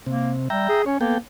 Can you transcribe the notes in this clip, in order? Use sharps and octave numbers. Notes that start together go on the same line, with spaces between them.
C3 A#3
G3 E5 G5 A#5
G#4
C#4 C#5
A#3 B3 A4 G5